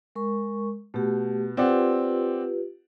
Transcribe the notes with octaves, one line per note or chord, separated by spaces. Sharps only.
G#3 A#4 C#6
B2 A3 G4
C4 F4 G4 B4 D5 F#5